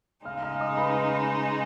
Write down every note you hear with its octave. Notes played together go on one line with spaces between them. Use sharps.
C#3 G#3 D#4 F5 F6
F5 F6
D#5 D#6
B4 B5